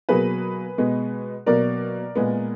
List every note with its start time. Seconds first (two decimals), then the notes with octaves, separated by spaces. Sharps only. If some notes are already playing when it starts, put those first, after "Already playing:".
0.09 B2 F#3 A#3 G#4 B4
0.78 B2 G#3 B3
1.46 B2 F#3 A#3 A#4 D5
2.15 A#2 G#3 B3